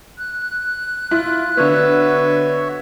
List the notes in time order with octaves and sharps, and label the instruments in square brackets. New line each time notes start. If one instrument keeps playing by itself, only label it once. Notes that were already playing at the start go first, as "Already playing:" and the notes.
[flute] F#6
[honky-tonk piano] E4 [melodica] F4
[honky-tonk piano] D3 B3 [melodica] F#4 C#5 E5 [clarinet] B4